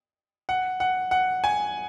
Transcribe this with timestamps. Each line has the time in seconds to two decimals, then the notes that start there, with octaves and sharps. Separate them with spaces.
0.49 F#5
0.80 F#5
1.11 F#5
1.44 G#5